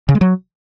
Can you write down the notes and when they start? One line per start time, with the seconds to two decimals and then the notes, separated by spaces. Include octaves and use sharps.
0.09 C#3
0.15 G#3
0.21 F#3